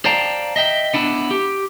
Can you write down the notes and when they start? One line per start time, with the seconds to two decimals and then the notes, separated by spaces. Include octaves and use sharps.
0.05 C5 D5 F5 G5 A5 A#5
0.56 D#5 E5 G5
0.94 B3 D4 E4
1.31 G4